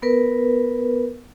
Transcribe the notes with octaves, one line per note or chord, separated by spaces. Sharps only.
B3 A#4 B4